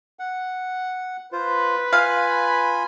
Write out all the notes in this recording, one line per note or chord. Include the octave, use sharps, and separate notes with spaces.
F#5
F4 B4 C5
F4 F5 G#5 B5